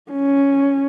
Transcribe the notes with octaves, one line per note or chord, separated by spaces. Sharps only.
C#4